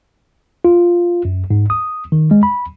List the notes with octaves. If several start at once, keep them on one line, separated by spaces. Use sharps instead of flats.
F4
F#2
G#2
D#6
D#3
G#3
B5